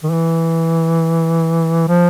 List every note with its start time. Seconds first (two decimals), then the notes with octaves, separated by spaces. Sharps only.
0.03 D#3
0.12 E3
1.88 F3